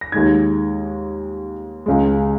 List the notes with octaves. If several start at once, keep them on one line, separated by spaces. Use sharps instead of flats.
A#6
D#2 D#3 G#3 D#4 G#6
C#2 C#3 G#3